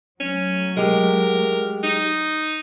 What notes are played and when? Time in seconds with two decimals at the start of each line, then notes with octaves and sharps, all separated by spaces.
0.20 F#3 A3 C#4
0.77 G#3 G4 A#4
1.83 D#4